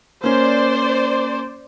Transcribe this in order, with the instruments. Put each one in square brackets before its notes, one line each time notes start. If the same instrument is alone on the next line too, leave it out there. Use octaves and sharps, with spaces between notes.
[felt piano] A#3 C#4 [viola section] C5 D5